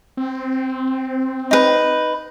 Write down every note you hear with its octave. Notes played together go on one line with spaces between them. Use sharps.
C4
D#4 B4